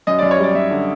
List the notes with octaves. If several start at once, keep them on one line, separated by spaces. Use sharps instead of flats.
F#2 D#5
F#2 D5
C#5
G3 D5
F#2 E5
D3